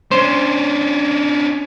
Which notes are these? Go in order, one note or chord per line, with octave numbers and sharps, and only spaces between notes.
C#4 D4 C5